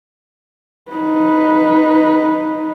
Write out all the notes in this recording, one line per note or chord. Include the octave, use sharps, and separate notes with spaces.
D#4 B4